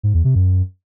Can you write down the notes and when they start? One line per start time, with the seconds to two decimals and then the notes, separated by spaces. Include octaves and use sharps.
0.03 G#2
0.14 E2
0.24 C3
0.35 F#2